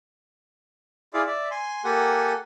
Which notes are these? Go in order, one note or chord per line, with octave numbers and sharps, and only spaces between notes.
E4 F4 G#4 D5 F5
D5 E5
G#5 C6
A#3 G4 A4 F#5 G#5